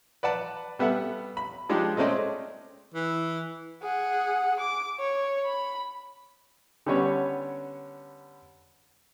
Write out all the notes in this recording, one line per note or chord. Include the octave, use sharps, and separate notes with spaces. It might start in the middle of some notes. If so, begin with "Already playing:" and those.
B4 D5 F#5 A5 B5
G3 B3 A4 E5 F#5
B5
F3 G#3 D4 D#4 G4
G#3 A3 C4 C#4 D5 D#5
E3
G#4 F#5
D6
C#5
B5
D3 G3 B3 C#4 C#5